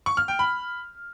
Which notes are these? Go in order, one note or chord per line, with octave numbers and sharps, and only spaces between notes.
C#6
F6
G5
B5